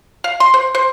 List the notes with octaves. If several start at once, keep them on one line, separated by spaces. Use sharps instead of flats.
F5
C6
C5
C5